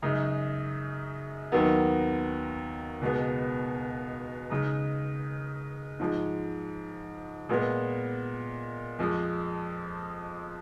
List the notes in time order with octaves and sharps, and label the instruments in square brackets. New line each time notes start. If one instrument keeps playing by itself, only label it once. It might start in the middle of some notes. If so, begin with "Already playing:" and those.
[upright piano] F#2 C#3 G#3 D#4
D#2 D#3 F#3 B3
C#2 B2 G#3 B3
C#3 G#3 D#4
G#2 F3 G#3
A#2 G#3 B3
F2 F3 G#3